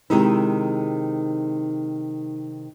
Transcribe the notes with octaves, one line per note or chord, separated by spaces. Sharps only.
C3 D#3 G#3 D#4 E4